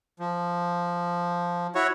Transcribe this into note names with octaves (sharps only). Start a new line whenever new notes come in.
F3
E4 F#4 C#5